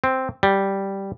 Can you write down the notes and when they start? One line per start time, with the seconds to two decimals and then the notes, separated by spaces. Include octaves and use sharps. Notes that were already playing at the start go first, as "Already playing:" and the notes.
0.04 C4
0.43 G3